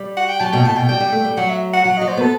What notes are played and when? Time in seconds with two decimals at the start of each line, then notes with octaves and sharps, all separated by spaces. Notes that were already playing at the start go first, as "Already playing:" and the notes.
Already playing: G3
0.17 F#5
0.29 G5
0.40 F#3 A5
0.53 B2 G5
0.64 A2 A5
0.76 B2 G5
0.89 G3 G5
1.00 G3
1.12 A3
1.25 G3
1.37 F#3 F#5
1.49 E5
1.73 F#5
1.84 F#3 F#5
1.97 F#3 D#5
2.08 C5
2.17 B3 A4